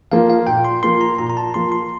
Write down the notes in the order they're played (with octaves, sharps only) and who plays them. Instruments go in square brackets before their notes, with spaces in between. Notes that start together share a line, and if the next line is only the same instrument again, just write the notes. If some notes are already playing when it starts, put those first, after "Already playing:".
[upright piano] F3 A#3 F4 [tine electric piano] F5
[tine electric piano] F5
[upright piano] A#2 [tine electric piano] G5
[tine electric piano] C6
[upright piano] F3 A#3 F4 [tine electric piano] C6
[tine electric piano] A#5
[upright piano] A#2 [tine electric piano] A#5
[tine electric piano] A#5
A5
[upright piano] F3 A#3 F4 [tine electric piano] C6
[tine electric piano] C6